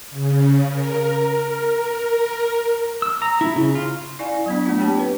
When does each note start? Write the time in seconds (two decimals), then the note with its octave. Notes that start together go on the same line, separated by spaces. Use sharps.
0.10 C#3
0.70 A#4
3.02 E6
3.22 A#5
3.41 E4
3.56 C#3
3.75 F4
4.19 E4 D5 F5 G#5
4.46 F#3 B3 D4
4.65 A3 C4 D4 F4
4.79 A#3 D4 G4 C#5 G5 A5
4.95 F4 B4